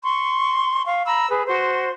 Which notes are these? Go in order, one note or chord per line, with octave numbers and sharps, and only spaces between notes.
C6 C#6
F5 C#6
A#5 B5 E6
G#4 B4
F#4 C5 C6